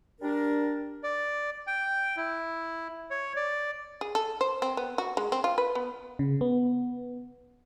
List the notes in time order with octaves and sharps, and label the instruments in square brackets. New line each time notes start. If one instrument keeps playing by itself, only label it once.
[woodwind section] G3 D4 A#4
[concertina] D5
G5
E4
C#5
D5
[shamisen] G#4
A4
C5
C4
B3
F#4
G#3
C4
F4
B4
B3
[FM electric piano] C#3
B3